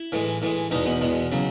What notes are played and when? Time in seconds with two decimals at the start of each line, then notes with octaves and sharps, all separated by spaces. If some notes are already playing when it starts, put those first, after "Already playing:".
Already playing: E4
0.12 A2 E3 G#3
0.42 A2 E3 G#3
0.71 E2 B2 G#3 D#4
0.86 B3
1.01 E2 B2 G#3
1.32 C#3 F#3